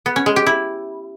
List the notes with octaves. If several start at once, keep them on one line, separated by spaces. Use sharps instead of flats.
B3
C#4
G#3
G4
E4